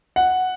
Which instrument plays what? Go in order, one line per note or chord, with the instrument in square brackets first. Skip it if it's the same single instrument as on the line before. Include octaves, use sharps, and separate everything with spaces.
[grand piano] F#5